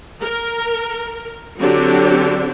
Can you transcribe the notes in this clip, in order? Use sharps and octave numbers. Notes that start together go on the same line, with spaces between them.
A#4
D3 F#3 C4 D4 F#4 G4